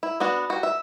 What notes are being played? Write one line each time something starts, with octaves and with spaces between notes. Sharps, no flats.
E4
B3 D4 F#4
F#4 G4
E5